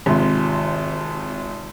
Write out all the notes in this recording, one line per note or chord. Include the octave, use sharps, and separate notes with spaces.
G#1 C3 F4